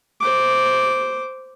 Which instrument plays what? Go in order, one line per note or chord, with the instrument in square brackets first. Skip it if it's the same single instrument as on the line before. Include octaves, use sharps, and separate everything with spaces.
[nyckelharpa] C5 D6